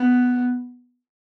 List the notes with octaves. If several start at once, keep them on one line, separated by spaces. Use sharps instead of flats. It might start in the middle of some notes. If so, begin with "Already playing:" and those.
Already playing: B3